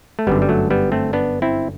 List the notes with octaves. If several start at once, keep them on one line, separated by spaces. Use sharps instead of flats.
A3
G1 F#2 D3 G3 B3
G3
F#3 A3
G3 B3
A3 C4
B3 D4
C4 E4